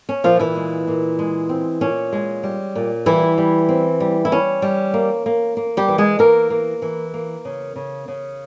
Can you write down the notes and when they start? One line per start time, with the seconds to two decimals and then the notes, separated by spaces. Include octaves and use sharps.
0.09 C#4
0.24 A#2 F3 F4
0.39 E3 E4
0.55 G#3
0.88 A#2
1.19 G#3
1.49 C4
1.81 A#2 C#4
2.12 G#3
2.43 G3
2.75 A#2
3.06 E3 G3 E4
3.38 G3
3.69 C4
4.00 G3
4.25 E4
4.32 G3 C#4
4.62 G3
4.94 A#3
5.26 A#3
5.57 A#3
5.77 G3 G4
5.88 E3
5.98 G#3 G#4
6.19 E3 A#3 A#4
6.50 A#3
6.82 E3
7.14 A#3
7.45 C#3
7.76 C#3
8.08 C#3